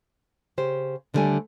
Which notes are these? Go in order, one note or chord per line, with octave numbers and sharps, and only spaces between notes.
C#3 G4 C5
D#2 D3 F3 G3 A3 G#5